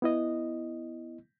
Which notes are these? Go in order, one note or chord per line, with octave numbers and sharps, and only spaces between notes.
B3 E4 D#5